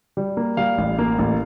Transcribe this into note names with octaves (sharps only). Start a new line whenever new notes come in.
G3
A#3
G3 F5
A1
A#3
A1